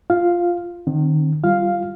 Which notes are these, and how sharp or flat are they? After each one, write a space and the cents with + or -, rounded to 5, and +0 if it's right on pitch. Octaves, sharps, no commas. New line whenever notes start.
F4 +0 F5 +0
D#3 -30 C4 +20
G3 -15 F4 -15 F5 +0